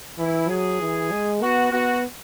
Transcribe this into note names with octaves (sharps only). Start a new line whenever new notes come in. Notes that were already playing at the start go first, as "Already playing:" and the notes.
E3 E4
F#3 G#4
E3
G#3
B3 F#4
B3 F#4